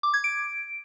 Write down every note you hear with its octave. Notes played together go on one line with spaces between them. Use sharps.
D6
G#6
D7